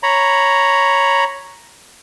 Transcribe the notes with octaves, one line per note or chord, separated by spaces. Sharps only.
C#5 A#5 B5